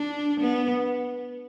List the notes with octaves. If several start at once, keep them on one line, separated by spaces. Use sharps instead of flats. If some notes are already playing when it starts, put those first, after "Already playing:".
Already playing: D4
B3